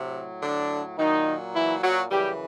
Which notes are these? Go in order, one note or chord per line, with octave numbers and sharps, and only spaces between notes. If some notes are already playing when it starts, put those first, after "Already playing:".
Already playing: A2 C3 F#3
D3 D4
A#2 D#3 F#3 D#4
E3 E4
F#3 F#4
F#2 C#3 E3 G3 G4